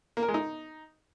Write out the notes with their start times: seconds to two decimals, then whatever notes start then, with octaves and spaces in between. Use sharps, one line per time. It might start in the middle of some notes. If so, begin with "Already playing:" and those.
0.17 A#3
0.23 A#4
0.28 G#3
0.34 D#4